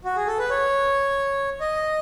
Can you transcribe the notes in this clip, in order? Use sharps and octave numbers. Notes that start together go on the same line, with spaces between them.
F#4
G#4
A4
B4
C#5
D#5